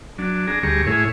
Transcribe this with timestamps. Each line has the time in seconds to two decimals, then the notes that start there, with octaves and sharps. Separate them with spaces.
0.18 F#3 D4
0.47 D4 G#4 A#5
0.63 D2 G3 G#4 A#5 C#6
0.87 A2 E4 G#4 C#5